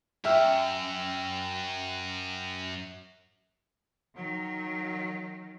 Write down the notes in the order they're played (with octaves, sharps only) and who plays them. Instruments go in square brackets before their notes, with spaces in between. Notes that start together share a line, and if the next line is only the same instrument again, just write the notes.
[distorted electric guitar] F#2 [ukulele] E5 [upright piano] G5 E6 F6
[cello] D#3 F#3